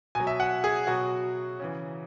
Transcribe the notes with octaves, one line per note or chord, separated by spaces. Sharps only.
B2 F#3 G#5
E5
F#5
G#4
B2 F#3 F#4
C#3 E3